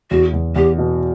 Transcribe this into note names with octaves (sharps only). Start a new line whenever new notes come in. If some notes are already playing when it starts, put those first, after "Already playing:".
E2 F#4
E2
E2 G4
B2